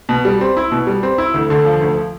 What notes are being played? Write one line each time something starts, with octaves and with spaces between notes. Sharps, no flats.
B2
G3
C4
E4
B2
G3
C4
E4
D2
D3
F3
D2